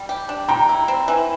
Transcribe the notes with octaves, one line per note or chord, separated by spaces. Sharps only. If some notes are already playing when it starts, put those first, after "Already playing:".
Already playing: G3
G4
D4
G3 G5 A#5
E4
C4
E3